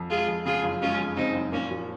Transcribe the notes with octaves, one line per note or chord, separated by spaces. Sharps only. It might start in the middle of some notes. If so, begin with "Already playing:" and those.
Already playing: F2
G#3 F4 G#4
F2
C#3 F4 G#4
F#1
G#3 C#4 F4
F2
C#3 C4 D#4
F#1
A#2 A#3 C#4
F3